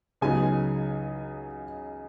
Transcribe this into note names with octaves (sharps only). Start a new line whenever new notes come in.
C#2 C#3 F#3 B3 D#4 G#5